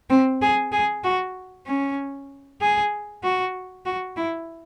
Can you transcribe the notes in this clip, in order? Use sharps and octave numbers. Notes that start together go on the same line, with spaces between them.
C4
G#4
G#4
F#4
C#4
G#4
F#4
F#4
E4